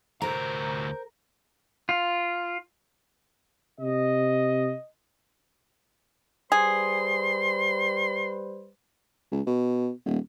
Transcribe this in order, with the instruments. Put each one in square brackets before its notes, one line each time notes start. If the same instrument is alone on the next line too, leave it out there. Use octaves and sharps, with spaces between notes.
[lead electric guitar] D2 A#5 [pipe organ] A2 C3 F#4 [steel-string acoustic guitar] A#4 [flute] C5
[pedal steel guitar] F4
[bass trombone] C3 [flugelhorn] D#5
[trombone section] G3 B4 C5 [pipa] G#4 [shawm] C6
[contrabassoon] C#2
B2
D#1